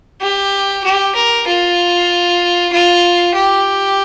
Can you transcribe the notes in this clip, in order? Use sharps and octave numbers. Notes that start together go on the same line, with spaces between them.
G4
G4
A#4
F4
F4
G4